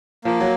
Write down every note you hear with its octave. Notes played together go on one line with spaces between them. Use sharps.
F3 A#3
F#3